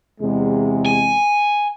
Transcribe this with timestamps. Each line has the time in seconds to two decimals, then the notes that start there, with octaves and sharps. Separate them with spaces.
0.20 E2 C3 G#3
0.86 G#5